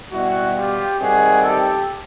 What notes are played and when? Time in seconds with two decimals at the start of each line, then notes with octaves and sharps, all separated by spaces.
0.12 B2 G3 E4 F#4
0.55 F4 G4
0.99 C3 D#3 G3 F#4 G#4
1.43 G4 A4